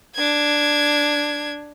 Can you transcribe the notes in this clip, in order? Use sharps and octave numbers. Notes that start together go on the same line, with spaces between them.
D4 G#6